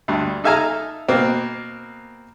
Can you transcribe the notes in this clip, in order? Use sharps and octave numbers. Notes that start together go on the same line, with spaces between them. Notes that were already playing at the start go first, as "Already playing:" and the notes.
D2 G2
D#4 A4 E5 F5 G#5 A#5
B2 A#3 C4